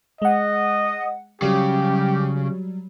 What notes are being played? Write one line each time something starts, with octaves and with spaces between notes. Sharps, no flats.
G#3 D#5 F#5
C#3 F#3 G3 G4